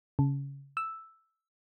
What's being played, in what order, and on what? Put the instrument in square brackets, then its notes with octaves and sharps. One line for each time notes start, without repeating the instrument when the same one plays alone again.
[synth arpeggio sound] C#3
E6